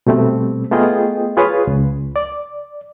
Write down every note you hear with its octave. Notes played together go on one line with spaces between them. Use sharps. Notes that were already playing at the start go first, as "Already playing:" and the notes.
B2 G3 A3 C4
A3 B3 F4 G#4 D#5 G5
F4 G#4 B4 C#5
C#2
D5